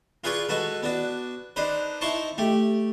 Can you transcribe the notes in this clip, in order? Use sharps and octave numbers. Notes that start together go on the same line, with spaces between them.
F4 G#4 B4 D5 G#5 C#6
G#3 F#4 A4 B4
B3 D4 F#4
D4 D#4 B4 C5
D#4 E4 C5 A5 C6 C#6
A3 G4